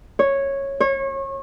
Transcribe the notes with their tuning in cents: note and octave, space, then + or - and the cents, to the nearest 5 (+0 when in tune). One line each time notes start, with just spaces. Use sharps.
C#5 -10
C#5 -30